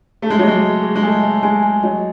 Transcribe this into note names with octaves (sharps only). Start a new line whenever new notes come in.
A3 G#4
G#3
F#3
G#3 G#4
G#4
G#4
G#3
A3 G#5
D#5
G#3 G#5
G#5
F#3 D#5